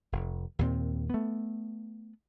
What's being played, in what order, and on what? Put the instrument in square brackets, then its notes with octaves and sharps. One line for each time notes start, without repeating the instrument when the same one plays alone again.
[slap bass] F1
D#2 A#2 C4
A3 B3